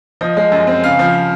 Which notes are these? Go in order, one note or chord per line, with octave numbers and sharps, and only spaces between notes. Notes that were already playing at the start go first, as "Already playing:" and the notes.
F3 D#5
G#3
F#2
C4
C#3 F5
F3